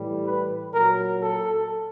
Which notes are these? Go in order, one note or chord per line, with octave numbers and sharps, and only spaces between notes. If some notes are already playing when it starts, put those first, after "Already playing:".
Already playing: A2 E3 G3
B4
A#2 F#3 A#4
A4